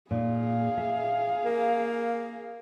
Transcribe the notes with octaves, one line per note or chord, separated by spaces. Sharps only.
A#2 D#4 G#4 F5
E5
A#3